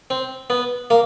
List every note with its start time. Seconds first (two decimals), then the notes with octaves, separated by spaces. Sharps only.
0.10 C4
0.50 B3
0.90 A#3